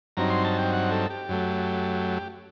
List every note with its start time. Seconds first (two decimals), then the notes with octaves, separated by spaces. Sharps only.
0.17 G2 F#3 C4 D#4 A#5
0.30 C6
0.44 A5
0.58 G5
0.73 F#5
0.91 A4
1.10 G4
1.29 F#2 F#3 A3